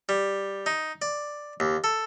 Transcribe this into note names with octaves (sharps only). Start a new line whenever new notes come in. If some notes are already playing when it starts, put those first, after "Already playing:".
G3
D#4
D5
D#2
A4